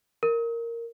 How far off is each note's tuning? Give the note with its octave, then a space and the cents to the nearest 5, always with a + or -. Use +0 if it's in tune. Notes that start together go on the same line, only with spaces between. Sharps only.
A#4 -10